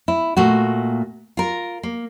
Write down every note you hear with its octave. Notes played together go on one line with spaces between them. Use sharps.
E4
A#2 A3 F#4
F4 A#4
A#3